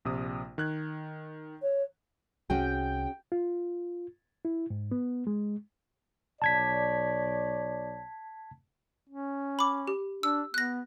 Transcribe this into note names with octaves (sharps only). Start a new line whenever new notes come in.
A#1 C3 D#6
D#3 F#6 G#6
C#5
C2 C#4 F#4 G#4 G5
F4
E4
G#2
B3
G#3
B1 C#5 D5 A5 G#6 B6
C#4
B5 D6
G4
D4 E6
B3 F#6 A#6